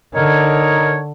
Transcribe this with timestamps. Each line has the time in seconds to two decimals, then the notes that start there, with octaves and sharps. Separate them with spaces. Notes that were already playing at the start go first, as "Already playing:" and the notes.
0.14 D3 D#4 A#4 C#5